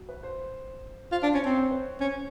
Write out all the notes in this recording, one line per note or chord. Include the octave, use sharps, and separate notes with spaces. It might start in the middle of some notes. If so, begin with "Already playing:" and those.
Already playing: F#4
B4
C5
F4 C5
D4
C5
C#4
C4 C#5
C5
B4
C#4